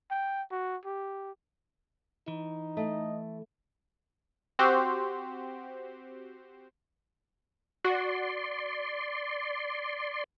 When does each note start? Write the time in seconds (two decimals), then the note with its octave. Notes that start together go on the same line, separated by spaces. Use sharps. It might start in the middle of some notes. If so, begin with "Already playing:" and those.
0.11 G5
0.51 F#4
0.85 G4
2.28 E3 D#4
2.77 A3 D#5
4.59 C4 F#4 G4 C5
7.85 F#4 D5 C6